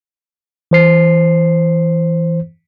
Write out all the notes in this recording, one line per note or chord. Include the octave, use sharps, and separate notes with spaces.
E3 C5 C7